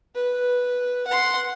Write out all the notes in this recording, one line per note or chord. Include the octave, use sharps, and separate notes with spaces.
B4
F#5 C6